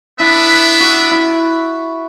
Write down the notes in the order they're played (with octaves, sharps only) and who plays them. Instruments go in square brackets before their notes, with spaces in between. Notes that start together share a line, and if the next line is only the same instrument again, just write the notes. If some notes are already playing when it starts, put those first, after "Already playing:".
[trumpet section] B3 D4 B4 E5 [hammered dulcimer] E4
[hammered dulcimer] F#4
E4